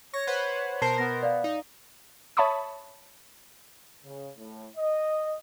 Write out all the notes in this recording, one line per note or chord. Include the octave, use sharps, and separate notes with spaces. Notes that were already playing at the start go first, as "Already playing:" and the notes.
C#5 C#6 A#6
B4 C5 F#5
B2 A#4 C5 A5 C7 G7
B3 A#6
D5 F5
D#4
C#5 E5 A5 B5 C#6 D#6
C#3
A2
D#5